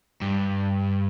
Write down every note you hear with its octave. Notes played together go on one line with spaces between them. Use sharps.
G2